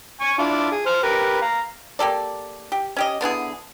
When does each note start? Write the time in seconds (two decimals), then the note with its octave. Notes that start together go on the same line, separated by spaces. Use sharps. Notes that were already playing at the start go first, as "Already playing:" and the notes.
0.21 G#5 C#6
0.38 D4 E4 F4
0.72 G#4
0.86 C5 F6
1.03 G4 A#4 B4
1.42 F5 A#5
1.99 A#3 G4 A4 D5
2.72 G4
2.97 C#4 G4 D#5
3.21 D3 B3 E4 G#4